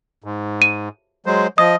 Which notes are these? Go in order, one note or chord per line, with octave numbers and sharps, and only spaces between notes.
G#2
D#7
F#3 G#3 C5
F3 D#5 D#6